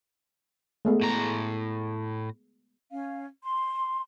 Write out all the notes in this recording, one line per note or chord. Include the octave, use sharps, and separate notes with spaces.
G#3 A3 B3
A2 A#5
C#4 F5
C6